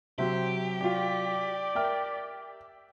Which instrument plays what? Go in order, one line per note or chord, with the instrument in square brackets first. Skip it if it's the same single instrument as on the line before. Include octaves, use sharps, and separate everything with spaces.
[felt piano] C3 F#3 [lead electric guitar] G4 [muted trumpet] C5 [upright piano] E5
[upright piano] F4 F#4 G5 [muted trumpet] D5
[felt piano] A#4 [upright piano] E5 G5 F6